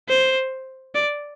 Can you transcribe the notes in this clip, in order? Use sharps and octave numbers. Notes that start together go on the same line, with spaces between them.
C5
D5